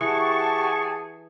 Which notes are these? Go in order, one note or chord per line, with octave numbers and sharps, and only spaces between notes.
E3 G4 G#4 F#5 A5 C#6